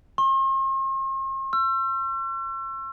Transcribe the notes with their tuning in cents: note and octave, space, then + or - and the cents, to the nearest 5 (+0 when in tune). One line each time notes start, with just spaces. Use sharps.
C6 +45
E6 +40